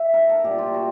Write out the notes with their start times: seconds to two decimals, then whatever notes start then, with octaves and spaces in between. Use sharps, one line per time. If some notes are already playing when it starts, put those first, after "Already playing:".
Already playing: E5
0.14 A#4
0.29 A4
0.44 A#2 G3 G4
0.58 F4
0.74 F#4